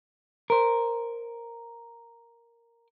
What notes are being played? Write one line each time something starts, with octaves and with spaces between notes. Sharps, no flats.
A#4 C5